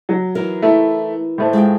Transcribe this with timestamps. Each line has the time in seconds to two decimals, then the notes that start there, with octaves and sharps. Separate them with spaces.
0.09 F#3
0.35 E3 D#4 A#4
0.62 A3 E4
1.38 A2 A3 C5
1.53 G#3 F4 G5